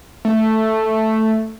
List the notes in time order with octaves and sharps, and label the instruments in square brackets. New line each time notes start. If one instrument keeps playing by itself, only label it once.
[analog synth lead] A3